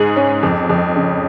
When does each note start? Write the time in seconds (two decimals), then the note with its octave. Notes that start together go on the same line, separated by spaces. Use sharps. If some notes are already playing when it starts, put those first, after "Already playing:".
Already playing: G#2 G#4
0.16 C#4
0.43 F2
0.70 F2
0.96 C#3